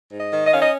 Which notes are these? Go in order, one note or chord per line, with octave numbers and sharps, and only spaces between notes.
G#2
D#5
D#3
D#5
C#4 F5
D#5